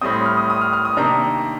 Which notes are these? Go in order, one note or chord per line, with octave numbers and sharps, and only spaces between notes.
A2 G3 C4 D#6
C6
F6
D#6
D#6
F6
F6
D#6
C3 D#3 A#3 D4 A#5